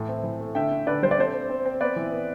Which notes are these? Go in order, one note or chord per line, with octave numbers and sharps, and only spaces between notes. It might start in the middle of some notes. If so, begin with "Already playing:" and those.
Already playing: A2 E3
C4
E3
A3
D3 E5 G5
D3
D3 B4 D5
G3 C5
D5
C4 A4 C5
C4
C4
C4
B3 B4 D5
E3
B3